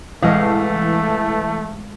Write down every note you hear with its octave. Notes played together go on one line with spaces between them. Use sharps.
C2 A2 E3 G#3 A3 D#5 F5